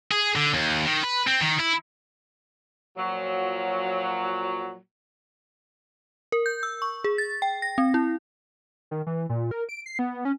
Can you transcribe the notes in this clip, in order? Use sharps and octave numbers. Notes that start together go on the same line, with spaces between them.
G#4
D3
D#2
D#3
B4
C4
D#3
E4
A#2 F3 F#3
A#4
G6
E6
C#6
G#4
A6
G5
A#6
C4
E4
D#3
E3
A#2
A#4
D7
C7
B3
C#4